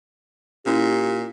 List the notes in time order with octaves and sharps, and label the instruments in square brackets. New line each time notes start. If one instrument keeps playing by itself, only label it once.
[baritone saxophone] A#2 [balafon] C#4 E4 [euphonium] G4